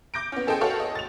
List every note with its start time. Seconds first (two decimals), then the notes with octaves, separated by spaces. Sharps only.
0.14 D6 G6 A#6 D7
0.32 B3 C#4
0.47 G#4 A4 C5 D#5 G5 G#5
0.61 F#4 A4 C#5 F5
0.80 D#5
0.95 A6 F7